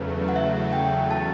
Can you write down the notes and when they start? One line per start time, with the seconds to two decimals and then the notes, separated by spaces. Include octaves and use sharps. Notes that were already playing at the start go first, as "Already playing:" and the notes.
Already playing: E2 C#3 F#3 A3 B4
0.28 F#5
0.36 E5
0.73 G5
1.11 A5